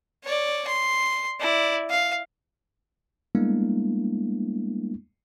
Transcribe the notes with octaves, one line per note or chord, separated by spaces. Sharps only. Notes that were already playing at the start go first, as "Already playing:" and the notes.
C#5 D5
C6
E4 D5
F5
G3 G#3 A#3 B3 D4 E4